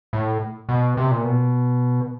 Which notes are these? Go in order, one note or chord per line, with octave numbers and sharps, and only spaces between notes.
A2
B2
C3
A#2
B2